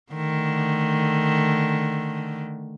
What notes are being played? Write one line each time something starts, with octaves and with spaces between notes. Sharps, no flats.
D3 D#3 A3